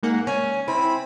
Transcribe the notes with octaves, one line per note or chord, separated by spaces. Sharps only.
G#2 A#3 F#5
C#4 G#5
C4 E4 B5